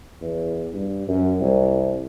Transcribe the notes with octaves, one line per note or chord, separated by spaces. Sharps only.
E2
G2
F#2
C2